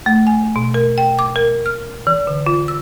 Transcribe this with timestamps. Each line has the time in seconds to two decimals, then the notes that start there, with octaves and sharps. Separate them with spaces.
0.06 A3
0.27 G#5
0.56 B2
0.74 A#4
0.98 G5
1.19 D6
1.36 A#4
1.66 F6
2.07 E3
2.27 D3
2.47 F4
2.68 E6